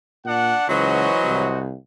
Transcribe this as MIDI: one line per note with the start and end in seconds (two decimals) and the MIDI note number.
0.24 0.54 46
0.24 0.67 62
0.24 0.67 78
0.68 1.08 37
0.68 1.46 52
0.68 1.46 54
0.68 1.60 66
0.68 1.60 72
0.68 1.60 75
1.23 1.75 36